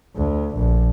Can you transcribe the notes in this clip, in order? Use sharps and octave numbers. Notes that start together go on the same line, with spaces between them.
D2
A#1